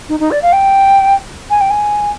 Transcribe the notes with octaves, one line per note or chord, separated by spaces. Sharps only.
D#4
D#4
D5
F5
G5
G#5
G5
G#5